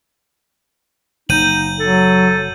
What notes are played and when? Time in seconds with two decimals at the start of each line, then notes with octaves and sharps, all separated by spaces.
1.29 F#1 D#4 G6 D#7 F#7
1.79 F#3 A4